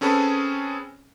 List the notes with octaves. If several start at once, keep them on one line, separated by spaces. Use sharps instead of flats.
C4 C#4 G#4 A4 B4